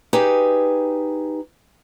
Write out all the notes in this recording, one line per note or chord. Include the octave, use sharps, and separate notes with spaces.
D#4 G4 G#4 B4